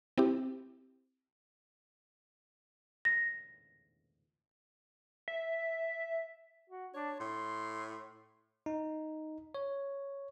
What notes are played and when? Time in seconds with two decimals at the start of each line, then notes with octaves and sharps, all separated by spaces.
0.18 C4 E4 G4
3.05 A#6
5.28 E5
6.70 F#4
6.94 D4 C#5
7.20 A2 C6
8.66 D#4
9.55 C#5